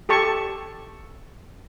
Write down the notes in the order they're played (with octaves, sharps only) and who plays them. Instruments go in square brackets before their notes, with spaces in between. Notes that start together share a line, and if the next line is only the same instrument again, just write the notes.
[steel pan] G4 A4 A5 C#6